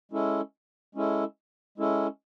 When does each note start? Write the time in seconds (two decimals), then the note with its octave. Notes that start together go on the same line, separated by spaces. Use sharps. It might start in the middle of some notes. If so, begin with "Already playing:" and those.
0.11 G#3 C#4 E4 A4
0.95 G#3 C#4 E4 A4
1.78 G#3 C#4 E4 A4